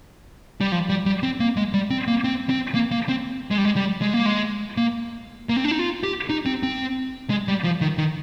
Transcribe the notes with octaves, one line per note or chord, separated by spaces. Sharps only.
G3
F3
G3
G3
C4
A#3
G#3
G3
C4
A#3
C4
C4
A#3
A#3
C4
G#3
G3
G#3
G3
G#3
A#3
G#3
A#3
A#3
C4
D4
D#4
F4
G4
D#4
C4
C4
G#3
G3
F3
D#3
D#3